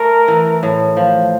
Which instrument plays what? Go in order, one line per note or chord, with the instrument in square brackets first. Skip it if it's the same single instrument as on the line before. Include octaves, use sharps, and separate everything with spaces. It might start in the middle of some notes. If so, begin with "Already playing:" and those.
Already playing: [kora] A3 [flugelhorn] A#4
[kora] E3
A2
F3